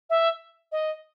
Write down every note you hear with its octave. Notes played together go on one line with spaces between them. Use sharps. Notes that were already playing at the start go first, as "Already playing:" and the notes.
E5
D#5